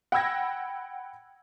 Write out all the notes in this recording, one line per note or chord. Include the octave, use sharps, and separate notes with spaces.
F#5 G5 B5 E6 G#6 A#6